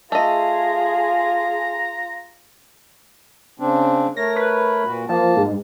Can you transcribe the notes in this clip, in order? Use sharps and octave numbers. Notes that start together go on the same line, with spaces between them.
A3 F4 G#4 D#5 A#5
C#3 C4 D4
A3 A#4 C#5 A#6
B4
A#2 F#4
F3 A#3 A5
G#2